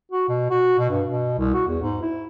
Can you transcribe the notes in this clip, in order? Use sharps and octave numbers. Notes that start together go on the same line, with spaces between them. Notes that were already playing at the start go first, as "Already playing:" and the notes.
F#4
B2
F#4
B2
G2
B2
C2
F#4
E2
G#2
E4